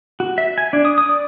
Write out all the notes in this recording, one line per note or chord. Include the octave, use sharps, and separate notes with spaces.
F#4
E5
G#5
D4
D#6
D#6
D5